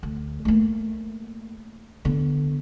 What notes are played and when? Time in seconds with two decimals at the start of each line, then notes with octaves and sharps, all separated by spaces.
0.03 D2
0.45 A3 A#3
2.05 D3 B3